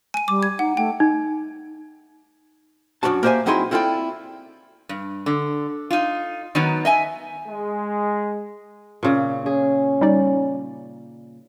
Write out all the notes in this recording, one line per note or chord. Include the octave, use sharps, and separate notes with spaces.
G#5 D#7
G3 D6
G#6
D#4 F#5
A3 G5
D#4
F#2 A3 D4 F#4 A5
A#3 G4 C5 D#5 E5 G#5
F#3 C4 D#4 E4 G#4 C6
C4 E4 F4 A4 D5 G5
G2
D3
D#4 F4
D#3 F#3 B3 D#4
D#5 E5 G#5
G#3
A#2 C#3
C#4 G#4
G3 D#4 D5